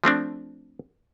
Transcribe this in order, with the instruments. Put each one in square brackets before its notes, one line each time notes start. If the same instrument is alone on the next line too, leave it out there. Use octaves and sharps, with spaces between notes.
[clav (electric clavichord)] F3 A3 C4 D4